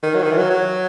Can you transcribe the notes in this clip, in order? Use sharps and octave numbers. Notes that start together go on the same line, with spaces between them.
D#3
F#3
D#3
E3
F#3
F#3